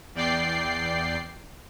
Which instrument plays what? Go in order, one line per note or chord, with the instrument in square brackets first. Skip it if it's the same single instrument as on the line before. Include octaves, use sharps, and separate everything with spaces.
[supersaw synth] E2 D5 G5 C7